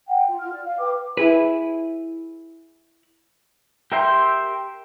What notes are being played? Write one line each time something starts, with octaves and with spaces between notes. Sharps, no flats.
F#5 G5
F4
F4 F6
D5
F5
B4 G5 D6
E4 G#4 B4
G4 A#4 E5 G5 C6